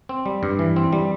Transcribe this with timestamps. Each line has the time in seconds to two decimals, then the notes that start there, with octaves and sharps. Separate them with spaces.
0.09 C4
0.26 G3
0.43 G2
0.59 E3
0.76 C4
0.93 G3